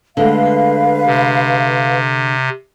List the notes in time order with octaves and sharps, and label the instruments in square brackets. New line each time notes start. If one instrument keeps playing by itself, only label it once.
[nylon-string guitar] D3 G#3 A3 [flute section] B4 F5
[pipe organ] C3